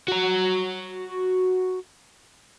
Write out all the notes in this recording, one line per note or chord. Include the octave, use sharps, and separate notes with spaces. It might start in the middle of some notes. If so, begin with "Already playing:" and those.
F#4 A#5